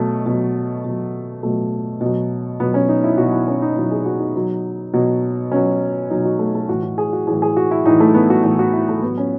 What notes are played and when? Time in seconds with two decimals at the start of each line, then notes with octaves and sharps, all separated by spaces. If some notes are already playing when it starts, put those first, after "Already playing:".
Already playing: B2 F#3 A3
0.26 B2 F#3
0.84 B2 F#3
1.43 B2 F#3 A3
2.01 B2 F#3
2.60 B2 F#3 B3
2.74 C#4
2.89 D#4
3.04 E4
3.18 B2 F#3 F#4
3.33 E4
3.48 C#4
3.62 D#4
3.76 B2 F#3 E4
3.91 G#4
4.06 F#4
4.20 D#4
4.35 B2 F#3
4.94 B2 F#3
5.52 B2 F#3 C#4
6.10 B2 F#3 D#4
6.25 F#4
6.39 A3
6.55 A3
6.69 A2 E3 F#4
6.83 F#4
6.98 G#4
7.13 F#4
7.27 A2 E3 G#4
7.42 G#4
7.57 F#4
7.71 E4
7.85 A2 E3 D#4
8.00 A3
8.14 B3
8.30 F#4
8.44 A2 E3 F#4
8.59 F#4
8.73 E4
8.89 A3
9.02 A2 F#3 B3
9.18 C#4